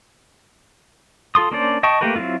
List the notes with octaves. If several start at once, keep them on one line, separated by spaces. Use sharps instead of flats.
F4 A4 C6 D#6
A#3 C#4 D4 C5 D5
D#5 G5 A5 C#6
A3 A#3 G4 A#4 B4
F#3 C4 E4 F4